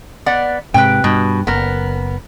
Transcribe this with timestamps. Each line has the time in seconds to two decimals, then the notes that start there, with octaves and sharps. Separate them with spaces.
0.26 B3 D5 F#5
0.74 G#2 C3 B4 G5
1.04 G2 B2
1.47 F#1 B3 A#4